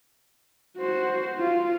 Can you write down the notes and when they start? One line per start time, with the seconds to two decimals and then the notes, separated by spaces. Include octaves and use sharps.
0.77 F#4 C5
1.38 F4